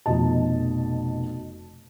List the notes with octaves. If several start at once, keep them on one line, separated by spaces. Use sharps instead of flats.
F1 F2 B2 D#5 A5